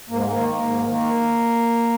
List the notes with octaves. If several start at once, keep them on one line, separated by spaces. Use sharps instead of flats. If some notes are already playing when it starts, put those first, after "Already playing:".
G#2 A#3
G#3
A#3
D#3
A#3
G#2
D#3 A#3